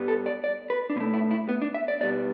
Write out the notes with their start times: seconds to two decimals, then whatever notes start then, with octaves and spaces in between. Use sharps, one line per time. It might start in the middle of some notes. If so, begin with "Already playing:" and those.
Already playing: G2 G3 B3
0.08 A4
0.26 D5
0.44 D5
0.70 B4
0.90 D4
0.96 B2 B3
1.00 A3
1.14 E4
1.31 E4
1.49 B3
1.62 D4
1.74 E5
1.88 D5
2.01 B2 G3 B3 D5